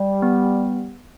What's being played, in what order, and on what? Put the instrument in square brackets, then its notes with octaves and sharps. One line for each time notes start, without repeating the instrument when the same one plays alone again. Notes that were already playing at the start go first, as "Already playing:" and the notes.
Already playing: [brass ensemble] G3
[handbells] B3